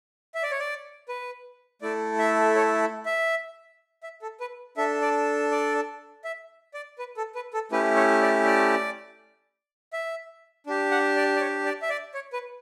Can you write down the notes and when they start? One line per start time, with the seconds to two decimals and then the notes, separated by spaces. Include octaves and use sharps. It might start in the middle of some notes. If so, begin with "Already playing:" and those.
0.35 E5
0.43 D5
0.51 C#5
0.59 D5
1.09 B4
1.82 A3 E4 A4 D5
2.19 E5
2.55 C#5
3.06 E5
4.03 E5
4.22 A4
4.40 B4
4.77 D4 A4 E5
5.02 D5
5.51 D5
6.24 E5
6.74 D5
6.98 B4
7.17 A4
7.35 B4
7.53 A4
7.72 A3 C#4 E4 G4 B4
7.96 C#5
8.22 D5
8.46 D5
9.93 E5
10.67 D4 G4
10.91 F#5
11.16 D5
11.36 D5
11.40 C#5
11.65 D5
11.82 E5
11.90 D5
12.14 C#5
12.33 B4